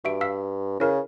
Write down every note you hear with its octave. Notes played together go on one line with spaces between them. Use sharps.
G2 F#4 E5 D7
F5 E6 B6
C#3 E4 A#4 B4